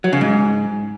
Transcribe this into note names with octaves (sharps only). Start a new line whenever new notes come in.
F#3
C#3
G#2